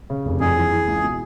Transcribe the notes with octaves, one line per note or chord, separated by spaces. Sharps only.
C#3
F1
F2 G#4
E3
E3
C#2
B2